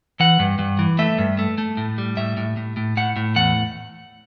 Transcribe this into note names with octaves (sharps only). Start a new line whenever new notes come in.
E3 F#5
G2
G2
E3
A3 E5
G2
A3
A3
A2
G3
A2 E5
A2
A2
A2
A2 F#5
A2
E2 F#5